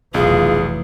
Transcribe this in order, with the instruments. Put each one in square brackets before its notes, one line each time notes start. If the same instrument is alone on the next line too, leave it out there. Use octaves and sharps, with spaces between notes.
[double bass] F1 E3 [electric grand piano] B1 [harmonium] F4 [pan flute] G#4